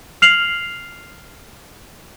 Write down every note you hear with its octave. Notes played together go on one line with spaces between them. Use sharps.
F6 C7 F7 F#7